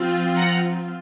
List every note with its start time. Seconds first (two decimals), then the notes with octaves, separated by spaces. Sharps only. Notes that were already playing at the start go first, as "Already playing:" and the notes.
Already playing: F3 C4 F4
0.37 F#5 A#5